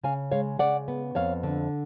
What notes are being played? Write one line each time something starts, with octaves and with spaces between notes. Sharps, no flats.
C#3 F5 G#5
G#3 C#5 F5
C#3 D5 F#5
B3
F2 C#5 F5
D3